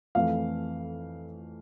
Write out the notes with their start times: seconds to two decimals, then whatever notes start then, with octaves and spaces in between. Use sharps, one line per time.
0.15 F2 E3 A3 F5